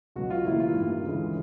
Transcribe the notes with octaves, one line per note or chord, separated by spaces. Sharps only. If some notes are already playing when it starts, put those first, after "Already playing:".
C#2 B2 F#3 F#4
F4
A2 E3 G3 A#3 E4
F4
G2 D#3 G3 A#3
D2 C#3 E3 G#3